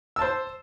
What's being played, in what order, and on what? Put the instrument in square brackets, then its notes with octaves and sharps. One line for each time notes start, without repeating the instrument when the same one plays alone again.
[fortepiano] E6
A5
C5